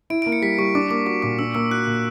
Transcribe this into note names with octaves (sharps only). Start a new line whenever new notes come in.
E4 D7
A#3 D7
C#7
G3 B6
G3 C#6
D4 D6
A#3 D6
F#4 C#6
A#2 D6
D4 E6
A#3 E6
F#4 F#6
A#2